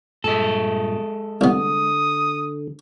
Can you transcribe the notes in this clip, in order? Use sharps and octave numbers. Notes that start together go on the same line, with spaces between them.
G2 A#2 G#3 A4
C2 D3 B3 D#6